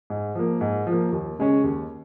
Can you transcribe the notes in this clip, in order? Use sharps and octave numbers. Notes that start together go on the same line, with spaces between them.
G#2
F3 A#3
G#2
F3
A#3
D#2
C#3 G#3 C#4
D#2